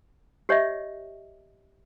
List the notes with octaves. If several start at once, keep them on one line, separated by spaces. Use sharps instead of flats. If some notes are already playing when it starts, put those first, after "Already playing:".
G4 C#5 D#5 E5